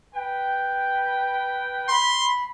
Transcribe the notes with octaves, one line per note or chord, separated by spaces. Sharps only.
B4 G5
B5 C6